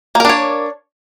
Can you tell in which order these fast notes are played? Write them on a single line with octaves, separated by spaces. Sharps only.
A#3 A#4 D4 C#5